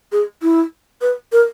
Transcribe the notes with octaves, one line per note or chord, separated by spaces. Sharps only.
G#4
E4
B4
A#4